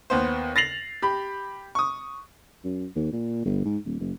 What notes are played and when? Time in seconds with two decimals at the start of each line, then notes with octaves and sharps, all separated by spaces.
0.10 D#2 B3 C5
0.56 A6 A#6 C7 F7 F#7
1.02 G4 B5
1.75 C#6 D#6
2.64 F#2
2.96 D#2
3.12 A#2
3.45 G1
3.65 G#2
3.85 D#1
4.00 F#1